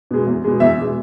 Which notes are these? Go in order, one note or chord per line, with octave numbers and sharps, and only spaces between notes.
B2 G#3
E2
B2 G#3
E2 E5
B2 G#3